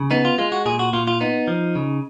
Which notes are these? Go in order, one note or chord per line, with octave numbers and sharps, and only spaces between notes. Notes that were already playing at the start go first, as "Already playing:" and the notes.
Already playing: C#3
B3 D#4
F4
G#3 F4
F#4
A#2 G#4
F#4
A#2 F4
F4
B3 D#4
F3
C#3